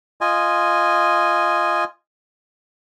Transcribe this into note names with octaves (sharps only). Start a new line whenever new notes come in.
F4 D#5 G#5